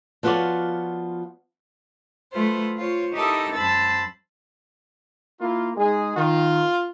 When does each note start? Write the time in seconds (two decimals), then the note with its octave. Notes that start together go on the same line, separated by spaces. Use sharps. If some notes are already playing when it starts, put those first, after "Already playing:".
0.23 F3 B3 F4 F#4 C#5 D5
2.33 F#3 A3 F4 B4 C5
2.77 F4 C5 C#5
3.14 D#4 E4 G4 A4 A#4 D#5
3.54 F#2 C5 A5 B5 E6 A6
5.41 A#3 E4 F4
5.77 G#3 D#4 G#4
6.17 D#3 F4